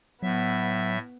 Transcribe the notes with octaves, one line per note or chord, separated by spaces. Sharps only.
A2 F#3 B3 E5